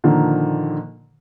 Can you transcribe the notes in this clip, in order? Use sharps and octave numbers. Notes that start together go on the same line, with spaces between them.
A#2 D3 D#3 F3 A#3